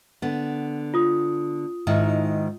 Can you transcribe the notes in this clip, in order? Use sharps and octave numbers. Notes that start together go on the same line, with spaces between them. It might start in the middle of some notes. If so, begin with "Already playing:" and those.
D3 B3
F4 D#6
G#2 D#3 E4